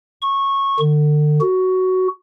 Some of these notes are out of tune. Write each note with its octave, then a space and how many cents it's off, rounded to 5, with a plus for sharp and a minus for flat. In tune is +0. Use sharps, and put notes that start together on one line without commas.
C#6 -15
D3 +35
F#4 +10